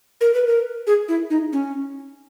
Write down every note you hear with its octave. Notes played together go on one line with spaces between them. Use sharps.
A#4
B4
A#4
G#4
E4
D#4
C#4